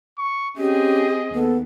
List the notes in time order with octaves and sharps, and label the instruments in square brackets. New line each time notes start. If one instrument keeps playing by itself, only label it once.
[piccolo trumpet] C#6
[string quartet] C4 G#4 [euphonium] C#4 [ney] G4 [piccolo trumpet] D#5
[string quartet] D#2 [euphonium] B3 [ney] A4